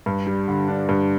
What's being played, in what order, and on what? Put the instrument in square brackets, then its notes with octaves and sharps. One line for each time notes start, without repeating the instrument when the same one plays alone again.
[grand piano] G2
G3
D3
D4
G2